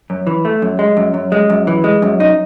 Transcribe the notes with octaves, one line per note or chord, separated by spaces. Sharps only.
F#2
E3
A3
F#2
G#3
F#2
F#2
G#3
F#2
E3
G#3
F#2
D#4